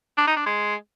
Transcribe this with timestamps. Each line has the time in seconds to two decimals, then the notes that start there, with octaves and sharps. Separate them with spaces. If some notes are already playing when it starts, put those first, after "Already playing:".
0.18 D4
0.27 D#4
0.36 D4
0.46 G#3